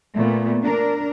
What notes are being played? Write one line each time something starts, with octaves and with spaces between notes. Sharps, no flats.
A#2 A3 B3
D4 A#4